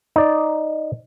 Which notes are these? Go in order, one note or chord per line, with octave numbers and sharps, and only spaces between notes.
D#4 D5